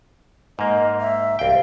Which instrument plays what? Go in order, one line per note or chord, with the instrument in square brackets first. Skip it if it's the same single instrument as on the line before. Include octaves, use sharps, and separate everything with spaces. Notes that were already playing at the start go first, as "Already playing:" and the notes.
[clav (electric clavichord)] G#2 A#3 [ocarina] D#5
[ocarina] E5
[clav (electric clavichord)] C2 G5 [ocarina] F5